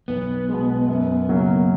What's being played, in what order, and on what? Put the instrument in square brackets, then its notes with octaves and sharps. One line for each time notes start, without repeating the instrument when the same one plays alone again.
[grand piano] B1 [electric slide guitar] B3
[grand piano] B2 G#3
F#2
C#3 F#3 A#3 C#4